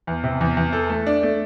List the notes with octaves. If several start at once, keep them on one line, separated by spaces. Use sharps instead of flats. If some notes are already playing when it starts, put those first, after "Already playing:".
E2
C3
E2
E2
A4
A3
D4
A3